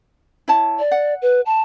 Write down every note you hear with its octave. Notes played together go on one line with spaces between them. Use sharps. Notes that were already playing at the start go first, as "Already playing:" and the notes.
E4 C#5 A5
D5
F#5
B4
A5